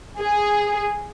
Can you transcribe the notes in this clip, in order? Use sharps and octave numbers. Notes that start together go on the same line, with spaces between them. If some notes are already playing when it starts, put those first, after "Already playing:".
G#4